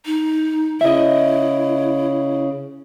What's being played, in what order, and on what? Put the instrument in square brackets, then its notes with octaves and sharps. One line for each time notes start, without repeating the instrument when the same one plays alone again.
[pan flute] D#4
[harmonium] C#3 [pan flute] E4 [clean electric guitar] D#5 E5